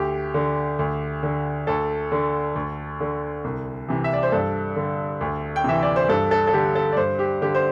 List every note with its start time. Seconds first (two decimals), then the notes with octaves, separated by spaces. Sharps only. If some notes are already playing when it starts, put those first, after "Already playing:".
Already playing: D2 G4
0.34 D3
0.79 D2
1.23 D3
1.67 D2 A4
2.12 D3
2.55 D2
3.00 D3
3.44 C2
3.88 C3 E3
4.04 E5
4.13 D5
4.23 C5
4.32 G2 A4
4.76 D3
5.21 D2
5.56 G5
5.64 C3 E3 E5
5.83 D5
5.96 C5
6.09 G2 A4
6.31 A4
6.47 A4
6.53 D3 G4
6.75 A4
6.92 D5
6.97 G2 C5
7.19 G4
7.42 D3 G4
7.55 C5